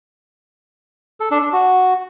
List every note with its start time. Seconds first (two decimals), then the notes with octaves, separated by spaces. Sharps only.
1.20 A4
1.31 D4
1.42 D4
1.53 F#4